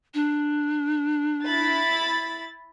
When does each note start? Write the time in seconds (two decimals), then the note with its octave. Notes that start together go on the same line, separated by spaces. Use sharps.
0.14 D4
1.46 E4 B5 A6